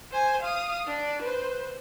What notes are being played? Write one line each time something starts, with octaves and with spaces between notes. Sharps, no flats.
C5 G#5
F5 D#6
D4 D5
B4 C5